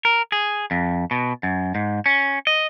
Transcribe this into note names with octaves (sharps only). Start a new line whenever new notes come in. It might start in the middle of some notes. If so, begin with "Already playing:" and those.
A#4
G#4
F2
B2
F#2
G#2
C#4
D#5